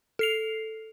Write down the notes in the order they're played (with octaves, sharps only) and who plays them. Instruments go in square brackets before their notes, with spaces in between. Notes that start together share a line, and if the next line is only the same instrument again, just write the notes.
[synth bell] A4 C7 F7